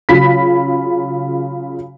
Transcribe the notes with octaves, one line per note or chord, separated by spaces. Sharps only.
C#3 F#3 F4 B5 B6